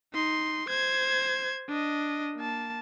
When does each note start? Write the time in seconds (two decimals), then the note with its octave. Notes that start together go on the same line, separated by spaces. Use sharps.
0.14 D#4 C6
0.69 C5 G#6
1.68 D4 D#5
2.36 A#3 A5